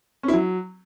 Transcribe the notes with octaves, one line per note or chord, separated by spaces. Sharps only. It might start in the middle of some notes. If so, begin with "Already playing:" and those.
C#4
E4
F#3